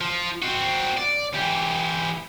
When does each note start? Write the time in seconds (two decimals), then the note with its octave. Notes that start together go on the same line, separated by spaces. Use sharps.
0.01 F3
0.43 C4 F#4
0.97 D5
1.34 E3 G4